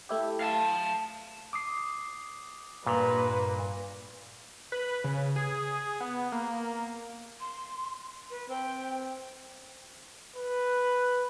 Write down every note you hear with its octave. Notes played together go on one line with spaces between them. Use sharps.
A3 E4 G4
F5 A5
D6 D#6 C7
G2 A#2 A#3 B4
B4
C#3
G#4
B3
A#3
C6
B4
C4 G5
B4